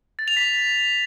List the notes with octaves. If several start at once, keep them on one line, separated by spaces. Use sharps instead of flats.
A6
F7
B6